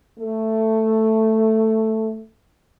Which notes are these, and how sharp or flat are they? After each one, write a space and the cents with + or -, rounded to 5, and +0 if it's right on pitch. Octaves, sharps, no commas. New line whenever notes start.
A3 +5